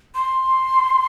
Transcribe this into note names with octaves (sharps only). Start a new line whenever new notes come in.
C6